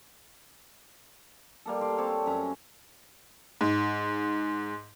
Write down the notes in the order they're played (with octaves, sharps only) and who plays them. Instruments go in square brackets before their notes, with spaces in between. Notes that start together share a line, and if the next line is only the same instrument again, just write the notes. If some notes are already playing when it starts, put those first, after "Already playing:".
[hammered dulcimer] G3 A#3 A4
D5 C6
C4 C#5 A5
F#2 C#4 E5 A#5
[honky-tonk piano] G#2